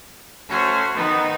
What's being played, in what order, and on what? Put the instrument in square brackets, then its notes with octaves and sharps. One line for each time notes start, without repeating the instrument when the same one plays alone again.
[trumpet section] A3 C#4 F#4 [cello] C5
[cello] D#3 D#4 [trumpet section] B3